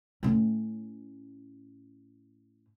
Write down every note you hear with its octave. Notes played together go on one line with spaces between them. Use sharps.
A2 C#4